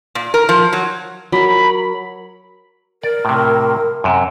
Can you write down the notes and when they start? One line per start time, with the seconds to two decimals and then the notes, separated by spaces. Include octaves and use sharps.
0.15 A#2
0.34 A#4
0.49 F3
0.73 F#3
1.32 F#3 A#4 B5
3.03 A#4 D5
3.25 A2 C3
4.04 F#2 C3